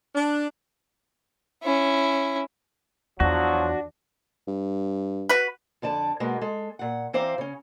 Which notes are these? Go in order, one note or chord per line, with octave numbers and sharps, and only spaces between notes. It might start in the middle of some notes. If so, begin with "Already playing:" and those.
D4
C#4 E4
E2 F3 F#3 D4 F#4
G2
F#4 B4
F2 D3 D5 A5
B2 G#3 A#3 B3
G#3 A4
A#2 F#5
E3 C4 C5 D5 F5 A#5
C#3 C#4